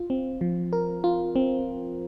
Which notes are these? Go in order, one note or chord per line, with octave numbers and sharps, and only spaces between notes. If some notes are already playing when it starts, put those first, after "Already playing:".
Already playing: F4
C4
F3
A#4
F4
C4